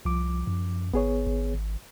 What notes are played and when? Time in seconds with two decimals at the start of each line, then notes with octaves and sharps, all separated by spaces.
0.05 C2 F3 D6
0.47 F#2
0.93 G#1 B3 G#4 C#5
1.27 G#1